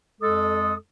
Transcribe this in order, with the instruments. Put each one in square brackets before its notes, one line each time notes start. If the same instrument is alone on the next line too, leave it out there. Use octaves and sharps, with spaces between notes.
[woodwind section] F2 G#3 A4 [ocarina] D#6